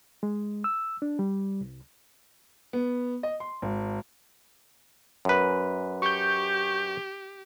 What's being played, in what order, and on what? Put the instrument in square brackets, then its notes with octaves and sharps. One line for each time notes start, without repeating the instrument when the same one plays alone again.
[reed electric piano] G#3
E6
D4
G3
C2
[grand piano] B3
D#5
C6
G#1
[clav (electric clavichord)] F#2 B4
[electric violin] G4 [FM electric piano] C#6 G6